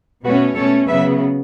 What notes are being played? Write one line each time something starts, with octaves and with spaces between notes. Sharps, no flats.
B2 A3 C#4 F#4 B4
B2 A3 C#4 A4 C#5
C#3 F#3 B3 B4 E5